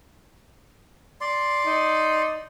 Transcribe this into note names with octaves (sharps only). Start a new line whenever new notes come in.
D5 C6
D#4